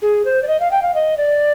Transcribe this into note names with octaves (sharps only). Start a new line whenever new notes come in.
G#4
C5
D5
D#5
F5
G5
F5
D#5
D5